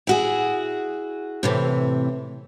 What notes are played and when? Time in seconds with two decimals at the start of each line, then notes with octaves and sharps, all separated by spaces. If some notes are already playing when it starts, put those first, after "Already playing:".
0.07 E4 F#4 G#4
1.43 A2 C3 E3